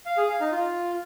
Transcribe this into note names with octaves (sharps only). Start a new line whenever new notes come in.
F5
G#4
F5
D#4
F4